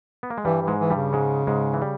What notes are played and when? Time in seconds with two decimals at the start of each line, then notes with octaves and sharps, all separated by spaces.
0.23 B3
0.30 A#3
0.38 G#3
0.45 G2 E3 G3
0.62 E3
0.68 G#2 G#3
0.80 E3
0.90 G2 G3
0.96 C#3
1.13 G#2 G#3
1.47 G#2 G#3
1.74 E3
1.82 G3